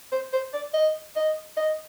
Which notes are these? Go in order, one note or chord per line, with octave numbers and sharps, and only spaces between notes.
C5
C5
D5
D#5
D#5
D#5